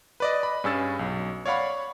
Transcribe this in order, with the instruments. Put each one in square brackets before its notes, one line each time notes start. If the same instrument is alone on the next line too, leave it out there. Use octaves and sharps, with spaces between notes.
[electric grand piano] B4 D5 D#5
B5
G2 C#4 G#4 E6 A6
B1
C#5 D5 F5 F#5 B5 C#6